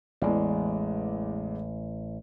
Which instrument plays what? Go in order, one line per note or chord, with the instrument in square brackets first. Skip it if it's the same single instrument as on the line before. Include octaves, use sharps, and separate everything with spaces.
[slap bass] A1 [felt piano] E2 G#3 D5